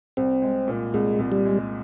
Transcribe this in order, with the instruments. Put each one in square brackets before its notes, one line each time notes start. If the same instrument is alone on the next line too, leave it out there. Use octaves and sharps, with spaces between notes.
[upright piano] C2 [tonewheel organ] C4
[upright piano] G#3
A#2
[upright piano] C2 [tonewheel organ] G#3
[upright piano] C2
[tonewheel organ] G3
[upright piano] G#3